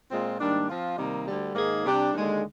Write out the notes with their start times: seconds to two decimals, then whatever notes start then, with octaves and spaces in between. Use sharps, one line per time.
0.11 A#2 G#3 C4 F4
0.39 G#2 D#3 G3 A#3 D4
0.69 F3 C4 F4
0.97 C3 D#3 G3 A#3 D#4
1.26 D2 D3 G3
1.55 G#2 D#3 A#3 D#4 G#4
1.84 C3 G3 D4 G4
2.13 D#2 D3 G#3